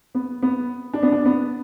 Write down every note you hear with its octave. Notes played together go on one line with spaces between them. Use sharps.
B3
B3
D4
B3
D4
B3